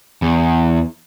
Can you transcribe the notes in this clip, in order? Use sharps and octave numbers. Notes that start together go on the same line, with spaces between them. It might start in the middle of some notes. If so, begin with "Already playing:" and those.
E2